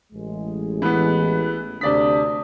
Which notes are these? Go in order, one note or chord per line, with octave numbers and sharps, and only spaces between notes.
A1 G#3
E3 B3 B5
D2 C3 D4 D5 D#6 B6